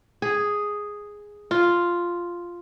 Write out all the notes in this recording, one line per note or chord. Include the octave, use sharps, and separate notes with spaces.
G#4
F4